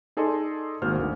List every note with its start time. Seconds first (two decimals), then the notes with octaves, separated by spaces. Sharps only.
0.17 D#4 G#4 A4 D5 D#5 C6
0.82 G#1 A#3 F#4 C5 F6
0.95 G#1 D2